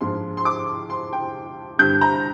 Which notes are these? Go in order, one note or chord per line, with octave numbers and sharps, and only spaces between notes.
G#2 F3 G#3 D4 C6
C6
D6
C6
G5
G2 D3 G3 G6
A#5